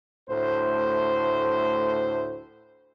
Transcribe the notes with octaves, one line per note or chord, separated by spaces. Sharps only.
D2 A2 C5